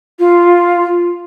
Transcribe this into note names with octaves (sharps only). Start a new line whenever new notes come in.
F4